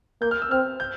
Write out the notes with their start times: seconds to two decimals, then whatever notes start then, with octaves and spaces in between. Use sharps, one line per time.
0.21 A#3 G6
0.31 F6
0.42 E6
0.51 C4 F6
0.80 G6